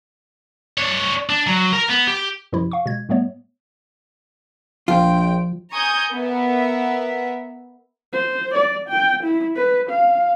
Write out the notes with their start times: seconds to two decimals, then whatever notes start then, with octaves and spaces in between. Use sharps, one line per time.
0.78 D4 C#5
1.29 D4
1.47 F#3
1.73 A#4 A#5
1.88 B3
2.07 G4
2.53 F#2 C3 F3 E4
2.72 F5 C#6
2.86 B2 G#3 G#6
3.09 A2 G3 A3 B3 C#5
4.88 A#1 F3 F4 G5
5.73 G#5 A#5 C#6 D#6 G6
6.13 B3 A#4 E5
8.13 C5
8.54 D5
8.89 G5
9.23 E4
9.57 B4
9.90 F5